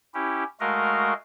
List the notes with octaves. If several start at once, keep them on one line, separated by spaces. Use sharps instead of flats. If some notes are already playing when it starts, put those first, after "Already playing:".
C#4 E4 G4
G#3 A3 F#4 A#4 D#5 F5